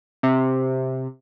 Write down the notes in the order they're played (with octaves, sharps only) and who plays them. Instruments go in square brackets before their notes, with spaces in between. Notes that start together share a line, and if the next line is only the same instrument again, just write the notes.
[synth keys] C3